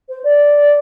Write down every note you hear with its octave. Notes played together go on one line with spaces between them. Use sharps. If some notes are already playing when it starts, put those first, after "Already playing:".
C5
D5